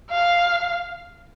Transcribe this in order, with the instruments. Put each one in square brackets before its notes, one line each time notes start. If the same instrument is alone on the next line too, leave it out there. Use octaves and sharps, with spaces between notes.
[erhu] F5